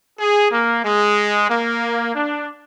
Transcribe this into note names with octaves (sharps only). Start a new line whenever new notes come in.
G#4
A#3
G#3
A#3
D4